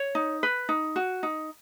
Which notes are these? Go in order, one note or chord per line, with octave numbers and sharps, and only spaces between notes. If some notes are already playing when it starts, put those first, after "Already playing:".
Already playing: C#5
D#4
B4
D#4
F#4
D#4